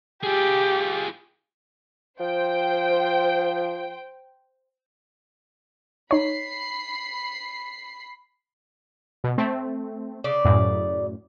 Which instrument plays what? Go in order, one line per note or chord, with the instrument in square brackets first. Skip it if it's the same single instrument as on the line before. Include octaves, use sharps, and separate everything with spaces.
[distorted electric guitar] F4 G#4 [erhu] G4
[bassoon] F3 [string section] C5 G5
[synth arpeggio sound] D#4 C#5 [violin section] B5 C7
[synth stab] B2
A3 C4
[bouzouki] C#3 D5
[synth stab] F#2 A2